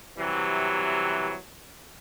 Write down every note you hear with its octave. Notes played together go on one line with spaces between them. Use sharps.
C3 E3 F#3 G3